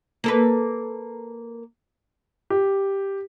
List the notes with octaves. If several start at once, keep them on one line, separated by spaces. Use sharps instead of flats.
A#3 A4 B4
G4